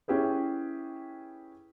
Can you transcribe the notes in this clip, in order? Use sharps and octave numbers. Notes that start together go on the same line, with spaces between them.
C#4 E4 G4 G#4 B4